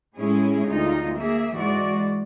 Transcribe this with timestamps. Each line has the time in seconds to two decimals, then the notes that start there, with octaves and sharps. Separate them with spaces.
0.16 A2 G#3 C#4 E4 G#4
0.67 D2 D#4 F4
1.17 A#3 G#4 E5
1.54 G#2 E3 G#3 F#4 D5